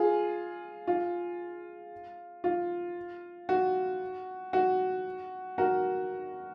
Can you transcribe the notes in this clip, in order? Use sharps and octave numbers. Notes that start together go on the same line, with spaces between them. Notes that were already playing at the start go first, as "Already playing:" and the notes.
Already playing: F4 G#4
F4
F4
F#4
F#4
F#4 A#4